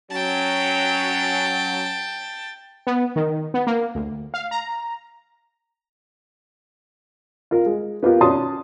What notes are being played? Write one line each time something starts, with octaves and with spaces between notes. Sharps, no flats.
F#3 C#4 G5 A5
B3
D#3
B3
A#3
D2
F5
A#5
F4 A#4
G#3
B3 F4 G4 A#4
C#4 F#4 D5 A5 C6 D#6